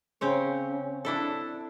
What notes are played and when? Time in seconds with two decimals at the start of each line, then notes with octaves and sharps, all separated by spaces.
0.21 C#3 C4 C#5
1.05 D4 E4 A4